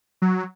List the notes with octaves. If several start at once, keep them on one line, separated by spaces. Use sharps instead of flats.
F#3